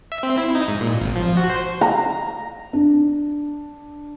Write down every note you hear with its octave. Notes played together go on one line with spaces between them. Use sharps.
E5
C4
E4
D#4
G#2
A#2
G#1
F3
F#4
C5
A#5
D4